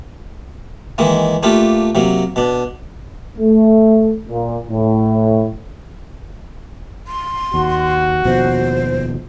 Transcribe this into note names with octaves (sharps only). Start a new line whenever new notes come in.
D#3 E3 G#3 A#3
A3 A#3 D4 F4 G4
C3 F#3 A#3
B2 D4
A3
A#2
A2
C6
D#2 F#4
D#2 B2 F3 C5